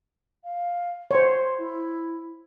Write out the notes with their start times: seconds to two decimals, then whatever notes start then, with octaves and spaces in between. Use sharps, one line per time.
0.43 F5
1.11 C5 C#5 C6
1.58 E4